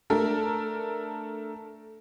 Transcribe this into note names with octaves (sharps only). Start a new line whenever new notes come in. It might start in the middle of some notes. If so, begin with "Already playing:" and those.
A3 D4 A4 A#4